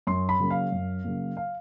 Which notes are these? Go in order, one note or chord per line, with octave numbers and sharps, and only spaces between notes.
F#2 C6
B5
C#3 F#3 A#3
F5
F#2
C#3 F#3 A#3
F5